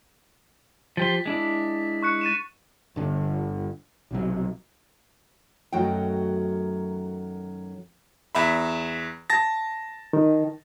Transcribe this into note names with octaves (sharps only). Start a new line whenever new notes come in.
F3 G4 C6 A6 B6
G#3 D4 E4
C#6 F#6 C#7
A6 D#7 E7
G1 D3
B1 C3 F#3
F#2 D#3 F#3 A3 G5
E2 E5 B5
A5 A6 A#6
D#3